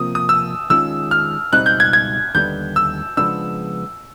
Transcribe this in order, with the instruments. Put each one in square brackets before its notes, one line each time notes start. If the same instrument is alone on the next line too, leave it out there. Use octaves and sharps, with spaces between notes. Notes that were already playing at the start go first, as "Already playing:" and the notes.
Already playing: [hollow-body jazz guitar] C3 F3 A#3 [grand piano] D#6
[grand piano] D#6
E6
[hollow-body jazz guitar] D#3 G#3 C#4 F4 [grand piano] E6
[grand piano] F6
[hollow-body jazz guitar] C#2 B2 G3 C4 D#4 [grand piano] F#6
[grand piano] G6
G#6
G#6
[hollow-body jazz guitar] D#2 D3 G3 B3 [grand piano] G6
[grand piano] E6
[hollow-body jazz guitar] C#3 F3 G#3 B3 D4 [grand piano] E6